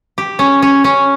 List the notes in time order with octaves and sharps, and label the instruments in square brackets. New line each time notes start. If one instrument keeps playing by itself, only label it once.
[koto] G4
C#4
C#4
C#4